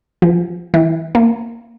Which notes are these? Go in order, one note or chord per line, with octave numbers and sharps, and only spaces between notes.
F3
E3
A#3